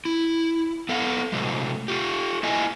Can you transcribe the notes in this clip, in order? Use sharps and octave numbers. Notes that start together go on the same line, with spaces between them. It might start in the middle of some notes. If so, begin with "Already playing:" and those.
E4
B3 A4 F5 F#5
A2 C3 F#3 G#3 A3
F4 G4
A#3 E4 D#5 E5 G#5